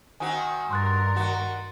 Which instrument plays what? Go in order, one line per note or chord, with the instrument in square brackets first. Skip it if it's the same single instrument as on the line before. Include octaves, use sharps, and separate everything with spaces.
[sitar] D#3 C4 F#4 [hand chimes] G#5
[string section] G2 A#4 [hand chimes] C6 F#6 A6
[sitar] D#3 F#4